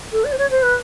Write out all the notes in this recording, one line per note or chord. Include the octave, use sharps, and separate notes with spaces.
A4
D5
C5
C#5
C5
B4